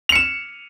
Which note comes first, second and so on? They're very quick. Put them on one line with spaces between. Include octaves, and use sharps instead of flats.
F7 C#7 E7